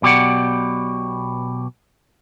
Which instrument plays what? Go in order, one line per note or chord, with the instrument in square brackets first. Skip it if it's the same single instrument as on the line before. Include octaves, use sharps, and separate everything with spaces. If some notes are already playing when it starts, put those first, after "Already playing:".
[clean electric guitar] B1 B2 G4 D5 F#5